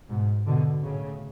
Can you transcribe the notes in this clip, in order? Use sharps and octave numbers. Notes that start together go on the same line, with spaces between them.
G#2 B2
B2 D3
A2 C#3